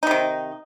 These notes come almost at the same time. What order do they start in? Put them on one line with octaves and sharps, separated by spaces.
D#4 C3 D#3